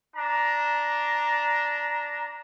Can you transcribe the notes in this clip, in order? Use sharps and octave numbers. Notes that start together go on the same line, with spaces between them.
D4 A#5